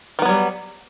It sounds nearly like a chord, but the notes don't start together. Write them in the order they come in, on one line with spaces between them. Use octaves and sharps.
D#3 B3 F#3 G3